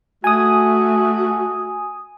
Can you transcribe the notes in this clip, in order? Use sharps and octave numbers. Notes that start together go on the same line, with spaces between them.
A3 F#4 G#5 D#6